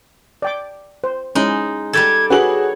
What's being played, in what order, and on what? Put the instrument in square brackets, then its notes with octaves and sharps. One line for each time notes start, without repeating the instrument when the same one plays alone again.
[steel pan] D5 G5 D6
C5
[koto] G#3 D#4 [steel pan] C#4 E4
[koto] G3 G4 A4 [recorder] G#6
[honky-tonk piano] F#4 G#4 F#7 [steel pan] B4 D6 [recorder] C#5